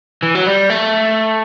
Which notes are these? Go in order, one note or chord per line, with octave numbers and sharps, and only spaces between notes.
E3
F#3
G3
A3